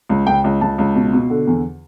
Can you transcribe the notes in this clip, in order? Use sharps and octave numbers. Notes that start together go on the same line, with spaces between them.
C#2
C#2 G5
C#2
C#2 A5
C#2
B2
B2
D3
E2